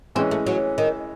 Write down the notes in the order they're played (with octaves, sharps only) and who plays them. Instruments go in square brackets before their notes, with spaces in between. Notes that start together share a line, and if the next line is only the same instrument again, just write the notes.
[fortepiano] E3 G#3 C#4 [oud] C4
[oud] A3
F#3
D#3